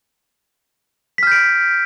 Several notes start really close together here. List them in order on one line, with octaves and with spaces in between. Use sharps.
B6 F6 G6 D7